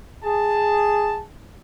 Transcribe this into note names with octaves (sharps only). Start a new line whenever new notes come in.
G#4 A5